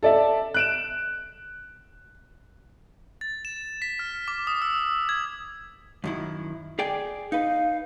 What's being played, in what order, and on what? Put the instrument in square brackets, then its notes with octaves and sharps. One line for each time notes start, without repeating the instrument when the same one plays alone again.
[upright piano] A4 D5 E5
F#6 D7 E7
[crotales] A6
E7
B6
F6
D6
D#6
E6
G#6
[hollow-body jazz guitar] F#2 D#3 E4
G#4 D5 G5
[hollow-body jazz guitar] D#4 B4 [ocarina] F5